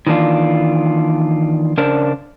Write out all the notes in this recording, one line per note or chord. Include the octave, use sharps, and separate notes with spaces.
D#3 E3 A#3 D4 F4
C#3 D4 A#4 C5 D5 A5